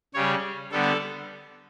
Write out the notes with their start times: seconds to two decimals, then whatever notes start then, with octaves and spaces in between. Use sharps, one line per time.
0.14 C#3 G3 C#4 C#5
0.71 D3 G3 B3 A4